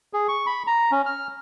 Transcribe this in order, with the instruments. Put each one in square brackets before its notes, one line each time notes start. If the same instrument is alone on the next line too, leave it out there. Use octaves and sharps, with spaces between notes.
[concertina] G#4
C#6
B5
A#5
C#4
F6